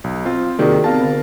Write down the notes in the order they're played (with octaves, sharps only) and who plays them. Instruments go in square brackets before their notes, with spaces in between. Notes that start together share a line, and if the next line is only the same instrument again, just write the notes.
[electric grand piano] B1
C4 F4
[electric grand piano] C3 D#3 A#3 [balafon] F#4 G#4 D5
[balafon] B3 C4 [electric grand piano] A#4 F5 A5
[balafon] D3